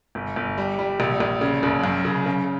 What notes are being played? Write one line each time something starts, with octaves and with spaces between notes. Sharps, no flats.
G1
G1
G3
G3
A#1
A#1
C#3
F#1
F#2
C#3
C#3